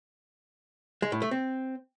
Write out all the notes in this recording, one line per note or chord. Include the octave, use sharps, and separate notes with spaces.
G#3
A2
A3
C4